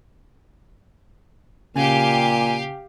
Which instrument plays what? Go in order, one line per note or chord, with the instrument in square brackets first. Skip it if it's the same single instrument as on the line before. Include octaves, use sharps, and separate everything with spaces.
[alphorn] A#2 [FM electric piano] C#3 [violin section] G4 F5 [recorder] G#5